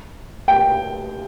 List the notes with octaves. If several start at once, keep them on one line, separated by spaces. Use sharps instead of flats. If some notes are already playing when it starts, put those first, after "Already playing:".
G5